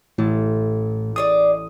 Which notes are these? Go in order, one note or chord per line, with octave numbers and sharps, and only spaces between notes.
A1 A2 A4
G#4 C#5 D5 D#6